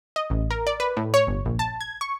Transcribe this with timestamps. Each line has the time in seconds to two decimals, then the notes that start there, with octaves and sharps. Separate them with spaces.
0.16 D#5
0.30 A1
0.50 A#4
0.67 D5
0.80 B4
0.97 A2
1.14 C#5
1.27 G1
1.45 A#1
1.59 A5
1.81 G#6
2.01 C#6